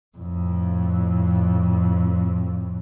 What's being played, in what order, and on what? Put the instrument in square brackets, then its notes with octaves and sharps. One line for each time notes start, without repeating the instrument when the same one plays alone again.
[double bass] F2 A2